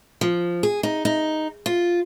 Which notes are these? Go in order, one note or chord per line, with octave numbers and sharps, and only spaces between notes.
F3
G#4
D#4
D#4
F4